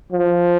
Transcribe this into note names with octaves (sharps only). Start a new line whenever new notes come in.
F3